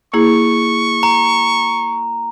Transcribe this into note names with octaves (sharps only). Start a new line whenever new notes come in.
A#3 E4 G#4 C#6
A#5